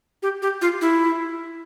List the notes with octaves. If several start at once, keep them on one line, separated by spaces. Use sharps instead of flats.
G4
G4
F4
E4